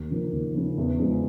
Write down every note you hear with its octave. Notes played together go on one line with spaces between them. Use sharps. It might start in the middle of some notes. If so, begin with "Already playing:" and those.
Already playing: D#2
C#3 F3 A#3
D#2
C#3 F3 A#3
E2
C#3 F3 G#3